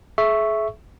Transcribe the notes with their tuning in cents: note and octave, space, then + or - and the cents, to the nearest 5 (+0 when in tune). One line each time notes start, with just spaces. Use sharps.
G#4 +40 E5 +0 C#6 +0